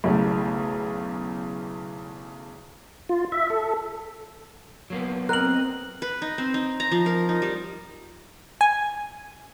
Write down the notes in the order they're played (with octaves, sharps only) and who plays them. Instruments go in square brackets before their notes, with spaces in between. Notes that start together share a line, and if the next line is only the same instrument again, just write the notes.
[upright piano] B1 E2 C#3 A3
[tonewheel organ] F4
E5
A4
[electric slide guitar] F#3 A#3 B3
[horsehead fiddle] C4 D#5 [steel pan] A#4 [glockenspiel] F#6 F#7
[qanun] B4
D#4
C4
D#4
A#5
F3
A#4
D#4
G3
[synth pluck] G#5